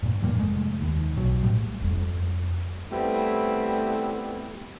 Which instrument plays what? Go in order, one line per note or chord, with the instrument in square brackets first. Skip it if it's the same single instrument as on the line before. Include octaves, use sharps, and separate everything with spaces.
[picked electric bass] G2 A#2
F2 A2 G3 A#3
F1 G#3 A3
D#2
B1 F#3
A2 G3
[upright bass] F2 G3
[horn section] G3 A3 B3 C4 E4